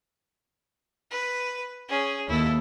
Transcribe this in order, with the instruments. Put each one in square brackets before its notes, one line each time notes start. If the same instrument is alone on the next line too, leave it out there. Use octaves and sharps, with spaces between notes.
[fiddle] B4
C#4 G#4
[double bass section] D#2 [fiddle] E4 A4